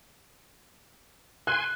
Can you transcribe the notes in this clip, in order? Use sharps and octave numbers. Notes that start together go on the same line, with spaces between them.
G#5 C6 F#6